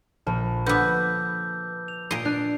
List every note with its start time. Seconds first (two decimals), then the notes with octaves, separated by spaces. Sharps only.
0.27 A#1 A5 F6
0.67 D3 B3 B4 D6 E6 G6
1.88 F7
2.11 A#2 D#5 C7 D7
2.25 D4 F#6 F7